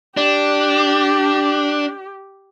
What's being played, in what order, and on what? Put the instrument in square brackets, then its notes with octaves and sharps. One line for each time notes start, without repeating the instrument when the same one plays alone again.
[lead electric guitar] D4 [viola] G4